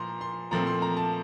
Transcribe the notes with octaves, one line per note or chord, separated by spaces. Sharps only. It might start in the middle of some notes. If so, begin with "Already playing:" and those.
Already playing: A#2 F3 A#5 C6
C6
A#2 F3 A3 C4 A#5
C6
A#5
A5